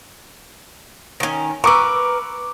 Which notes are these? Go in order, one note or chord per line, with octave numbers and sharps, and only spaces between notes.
D#3 C#4
A#4 B4 C#6 D6 E6